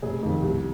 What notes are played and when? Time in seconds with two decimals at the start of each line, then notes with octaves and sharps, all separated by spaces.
0.02 F1 G#4
0.23 F2 D#3
0.42 C2